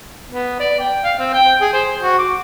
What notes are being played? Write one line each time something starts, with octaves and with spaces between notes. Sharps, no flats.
B3
D5
G5
F5
C4
G5
G#4
C5
F#4
D6